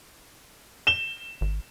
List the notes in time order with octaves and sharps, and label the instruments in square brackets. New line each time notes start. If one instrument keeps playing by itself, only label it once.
[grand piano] E7 G7
[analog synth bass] G#1